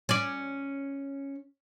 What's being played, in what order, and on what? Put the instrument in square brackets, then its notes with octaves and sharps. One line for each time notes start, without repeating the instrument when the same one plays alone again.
[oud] C#4 D5